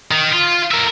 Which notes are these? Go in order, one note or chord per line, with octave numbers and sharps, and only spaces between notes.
D#3
F4
A#4 E5